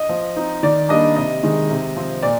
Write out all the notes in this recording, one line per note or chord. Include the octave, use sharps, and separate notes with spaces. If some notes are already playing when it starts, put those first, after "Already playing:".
Already playing: D#5
F3
C4 D#4
D#3 D5
G3 A#3 D4 D#5
C3 D#5
D#3 G#3
C3
F3 C4
A#2 D5